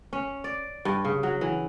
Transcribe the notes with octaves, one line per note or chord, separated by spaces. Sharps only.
C#4
D5
G2
C#3
F#3
E3